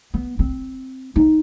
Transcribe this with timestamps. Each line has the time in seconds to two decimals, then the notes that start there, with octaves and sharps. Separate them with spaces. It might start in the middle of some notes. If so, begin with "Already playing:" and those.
0.14 B3
0.39 C4
1.16 D#4